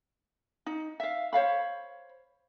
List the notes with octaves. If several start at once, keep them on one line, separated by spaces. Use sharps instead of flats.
D#4
E5 F5
C5 C#5 F5 B5